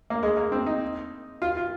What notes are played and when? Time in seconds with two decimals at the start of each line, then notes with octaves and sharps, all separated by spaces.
0.10 A#3
0.23 G#3
0.37 A#3
0.52 C4
0.66 D#4
1.42 F4
1.57 F4